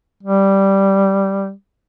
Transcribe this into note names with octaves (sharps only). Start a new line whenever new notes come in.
G3